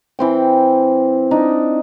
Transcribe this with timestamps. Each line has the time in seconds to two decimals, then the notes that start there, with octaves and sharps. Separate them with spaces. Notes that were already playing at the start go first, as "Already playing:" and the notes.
0.19 E3 C4 G5
1.31 D4 D#4